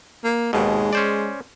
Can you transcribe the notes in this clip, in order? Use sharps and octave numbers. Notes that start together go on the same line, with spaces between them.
A#3
G#1 D#2 B2 G#3
C#4 C5 D5